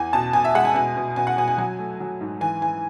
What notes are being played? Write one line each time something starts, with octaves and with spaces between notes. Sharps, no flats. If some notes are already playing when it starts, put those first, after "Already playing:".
Already playing: E2 G#5
B2 A5
B2 G#5
E5
G#3 F#5
G#5
B2 G#5
B2
B2 G#5
F#5
B2 G#5
G#5
F#3 G#5
A3
F#3
G#2
E3 G#5
E3 G#5